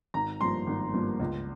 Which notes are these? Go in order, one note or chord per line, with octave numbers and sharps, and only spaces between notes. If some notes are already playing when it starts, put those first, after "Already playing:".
G#1 A#5
G2 F3 A#3 C6
G#1
G2 F3 A#3
C#2